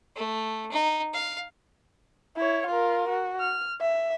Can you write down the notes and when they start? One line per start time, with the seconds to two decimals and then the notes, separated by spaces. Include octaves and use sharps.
0.16 A3
0.72 D#4
1.13 F5
2.37 E4 C#5
2.67 F4 A#4
3.09 F#4
3.40 F6
3.81 E5